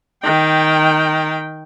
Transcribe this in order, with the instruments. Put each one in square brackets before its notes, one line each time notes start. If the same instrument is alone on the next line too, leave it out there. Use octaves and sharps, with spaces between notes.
[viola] D#3 G5